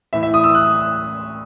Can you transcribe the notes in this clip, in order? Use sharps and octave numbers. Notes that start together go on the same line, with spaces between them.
A2 E3 E5
E5
D#6
E6
F#6